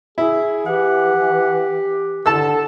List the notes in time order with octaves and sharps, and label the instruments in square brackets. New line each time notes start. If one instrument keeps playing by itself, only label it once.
[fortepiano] E4 [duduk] G#4
[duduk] E3 [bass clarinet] G4 [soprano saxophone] F#5
[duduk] D3 [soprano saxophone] A4 [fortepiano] A5 E6